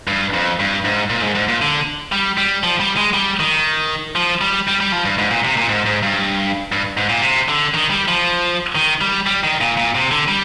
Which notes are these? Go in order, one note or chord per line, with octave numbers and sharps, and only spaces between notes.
G2
F2
G2
G#2
A#2
G#2
G#2
A#2
D3
G3
G3
F3
G3
G#3
G3
D#3
F3
G3
G3
G3
F3
G2
G#2
A#2
C3
A#2
G#2
G#2
G2
G2
G#2
A#2
C3
D3
D#3
G3
F3
D#3
G3
G3
D#3
A#2
A#2
C3
D3
G3